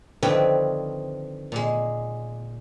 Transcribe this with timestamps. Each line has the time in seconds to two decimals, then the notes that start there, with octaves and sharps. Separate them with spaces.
0.23 D3 D#3 F3 C4 B4 C#5
1.52 A#2 G#3